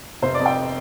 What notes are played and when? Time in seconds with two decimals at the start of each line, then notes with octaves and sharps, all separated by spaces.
0.22 F1 C5
0.34 D5
0.40 F2
0.46 G5